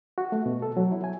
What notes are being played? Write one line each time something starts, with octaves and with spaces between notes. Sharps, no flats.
F#4
A3
B2
A4
F#3
E4
G#5